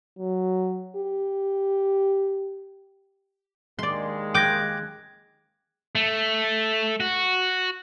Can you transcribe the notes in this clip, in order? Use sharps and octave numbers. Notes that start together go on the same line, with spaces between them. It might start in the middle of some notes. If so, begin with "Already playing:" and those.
F#3
G4
D#2 D#3 G#3 D5 C6
G5 D6 F#6 G#6 A#6
A3
F#4